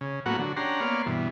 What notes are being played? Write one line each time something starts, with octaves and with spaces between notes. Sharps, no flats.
C#3
A2 F#3 A#3 B3 F#4 F#5
D3 F#3
C#4 D4 G4 F#5 A#5 C6
A#3 B3 C#5 D5 F5 C6
G2 B2 E3